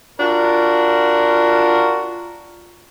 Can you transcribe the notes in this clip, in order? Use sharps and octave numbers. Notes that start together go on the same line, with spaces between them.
D4 F4 F#4 A#4